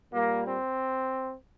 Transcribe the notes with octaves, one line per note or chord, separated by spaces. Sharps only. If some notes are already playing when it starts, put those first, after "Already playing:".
A#2 G3 A#3
C4